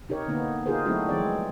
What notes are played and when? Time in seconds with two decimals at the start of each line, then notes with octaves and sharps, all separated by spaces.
0.09 C3 D#4 G4 A#4 C#5
0.28 D3 A#3 B3 D#4
0.66 D#4 F4 G4 G#4 A#4 C5
0.86 F#3 A3 C4 D#4 E4 F#4
1.09 E3 F3 G#3 C4 C#5 D5